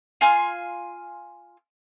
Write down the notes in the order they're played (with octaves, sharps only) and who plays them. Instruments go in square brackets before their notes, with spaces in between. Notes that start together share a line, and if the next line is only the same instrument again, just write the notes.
[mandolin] F4 G#5 C6 F6